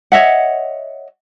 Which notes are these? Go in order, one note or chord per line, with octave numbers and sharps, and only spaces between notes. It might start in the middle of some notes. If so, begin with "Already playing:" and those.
C#5 D#5 E5 F#5